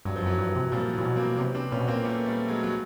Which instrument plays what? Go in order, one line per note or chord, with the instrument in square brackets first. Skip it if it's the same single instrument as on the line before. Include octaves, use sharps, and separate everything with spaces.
[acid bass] G2 [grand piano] F#3
[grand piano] F3
[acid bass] F#2 [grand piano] E3 F#3
[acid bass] G2
C3
[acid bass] A#2 [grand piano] F3 G3
[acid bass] A#2 [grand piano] E3 F#3
[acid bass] B2
[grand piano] A#3 C4
[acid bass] C3 [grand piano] B3 C#4
[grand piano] C4 D4
[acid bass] A#2 [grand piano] B3 C#4
[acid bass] B2
[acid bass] A#2 [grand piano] A#3 C4
[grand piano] A3 B3
G3 A3
F#3 G#3
F#3